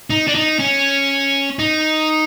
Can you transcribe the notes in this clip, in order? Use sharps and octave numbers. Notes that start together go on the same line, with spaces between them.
D#4
D4
D#4
C#4
D#4